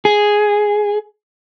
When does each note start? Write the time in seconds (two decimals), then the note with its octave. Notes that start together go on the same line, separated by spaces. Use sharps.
0.05 G#4